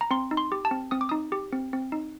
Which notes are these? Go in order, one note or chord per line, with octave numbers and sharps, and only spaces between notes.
A#5
C4 C6
D#4
C6
G4
A5
C4
C4 D#6
D6
D#4 D#6
G4
C4
C4
D#4